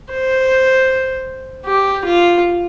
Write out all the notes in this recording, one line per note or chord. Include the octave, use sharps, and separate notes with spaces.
C5
G4
F4